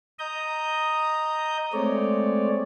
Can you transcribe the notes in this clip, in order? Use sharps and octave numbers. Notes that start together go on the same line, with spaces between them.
D#5 A#5 D#6 G6
G#3 A3 C4 C#5 D5